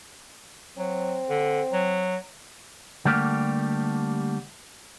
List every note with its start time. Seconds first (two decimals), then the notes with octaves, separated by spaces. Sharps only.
0.78 F#3 C4
1.30 D3
1.72 F#3
3.05 D3 G3 A3 A#3 G4